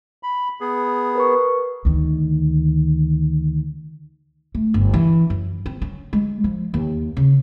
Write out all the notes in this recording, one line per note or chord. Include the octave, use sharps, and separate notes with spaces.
B5
B3 G#4
A#4 B4 C#6
D2 D#3
A3
G1
E3
F#2
C4
C#4
G#3
F3
D#2
C#3